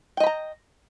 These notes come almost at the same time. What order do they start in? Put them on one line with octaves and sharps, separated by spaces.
G5 D#5 B5 A#5